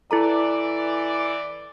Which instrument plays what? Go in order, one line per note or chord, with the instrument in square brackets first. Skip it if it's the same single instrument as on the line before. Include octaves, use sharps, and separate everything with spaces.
[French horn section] E3 D5 [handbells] E4 A4 A#5